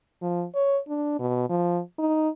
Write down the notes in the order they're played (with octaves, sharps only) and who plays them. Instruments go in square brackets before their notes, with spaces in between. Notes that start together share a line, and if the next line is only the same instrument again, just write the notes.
[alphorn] F3
C#5
D4
B2
F3
D#4